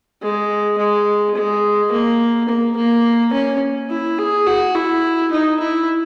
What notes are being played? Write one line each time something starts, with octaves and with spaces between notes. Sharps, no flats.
G#3
G#3
G#3
A#3
A#3
A#3
C#4
E4
G#4
F#4
E4
D#4
E4